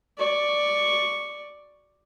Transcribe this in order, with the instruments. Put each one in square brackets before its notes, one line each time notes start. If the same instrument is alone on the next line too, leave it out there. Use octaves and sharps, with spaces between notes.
[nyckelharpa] D5 C#6